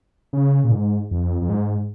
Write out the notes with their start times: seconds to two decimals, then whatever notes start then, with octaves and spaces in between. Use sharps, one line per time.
0.33 C#3
0.64 A#2
0.72 G#2
1.11 F2
1.42 F2
1.49 G#2